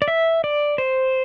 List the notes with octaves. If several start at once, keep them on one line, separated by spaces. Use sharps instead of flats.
D5
E5
D5
C5